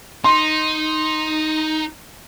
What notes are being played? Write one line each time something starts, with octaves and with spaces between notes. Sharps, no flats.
D#4 C6